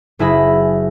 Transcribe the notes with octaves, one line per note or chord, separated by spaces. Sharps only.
F#1 E4 G#4 B5 A#6